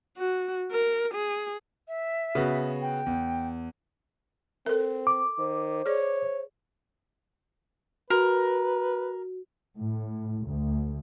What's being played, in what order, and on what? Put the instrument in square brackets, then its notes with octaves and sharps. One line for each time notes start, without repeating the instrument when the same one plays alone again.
[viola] F#4
A#4
G#4
[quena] E5
[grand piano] C#3 B3 F#4
[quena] G5
[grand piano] E2
[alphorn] C4 [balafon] A4 A#4
[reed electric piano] D6
[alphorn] D#3 [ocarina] C5
[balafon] G#4 D5 [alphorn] C#5
[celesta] F#4 [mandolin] A#4 [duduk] B4
[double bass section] A2
D2